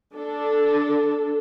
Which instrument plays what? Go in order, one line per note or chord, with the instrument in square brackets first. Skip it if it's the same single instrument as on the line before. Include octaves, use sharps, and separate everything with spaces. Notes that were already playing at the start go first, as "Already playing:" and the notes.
[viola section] D4 A4